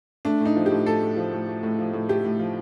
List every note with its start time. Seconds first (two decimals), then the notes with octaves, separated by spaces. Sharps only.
0.25 A3 D4
0.40 A2
0.45 D#4
0.56 F3
0.66 A2 G4
0.86 A3 A4
1.01 A2
1.16 F3
1.33 A2
1.48 A3
1.63 A2
1.79 F3
1.93 A2
2.09 A3 G4
2.24 A2
2.39 F3